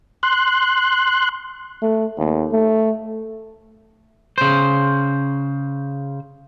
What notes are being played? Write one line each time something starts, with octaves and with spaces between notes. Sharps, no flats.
C6 F#6
A3
D#2
A3
C#3 C5